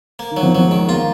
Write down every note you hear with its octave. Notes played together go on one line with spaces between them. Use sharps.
A#3
D#3
F#3
F3
F3 F#3
G#3
D#3
G#3
A#3 F4